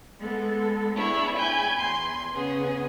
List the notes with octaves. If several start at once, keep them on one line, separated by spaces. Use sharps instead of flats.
G#3 B3 A4
B3 D4 E4 G#4 C#5 E5
G5 G#5 B5 G6 G#6
E2 C6
C#3 B3 G#4